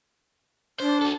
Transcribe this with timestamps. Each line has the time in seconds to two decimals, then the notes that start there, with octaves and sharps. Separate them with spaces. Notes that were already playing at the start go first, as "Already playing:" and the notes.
0.80 D4 C5
1.01 F#4 A4